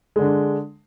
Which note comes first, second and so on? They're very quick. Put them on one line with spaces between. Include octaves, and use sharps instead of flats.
G#3 D3 D4